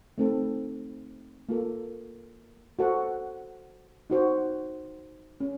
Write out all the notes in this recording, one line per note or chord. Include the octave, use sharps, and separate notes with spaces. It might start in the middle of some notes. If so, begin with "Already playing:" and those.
A3 C4 D#4 A4
A#3 F4 A4
F#4 A4 C5 F#5
D#4 F#4 C5
C#4